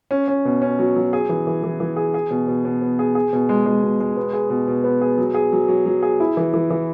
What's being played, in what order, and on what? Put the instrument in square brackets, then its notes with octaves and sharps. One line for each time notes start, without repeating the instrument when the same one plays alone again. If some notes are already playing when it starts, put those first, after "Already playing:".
[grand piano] C#4
C#4
B2
C#4
F#3
F#3
G#4
E3
E3
E3
E3
G#4
G#4
B2
B2
B2
B3
G#4
G#4
B2
G#3
G#3
B2
G#3
B3
G#4
B2
B2
B3
G#4
F#3
G#4
F#3
F#3
F#3
G#4
E4
E3
E3
E3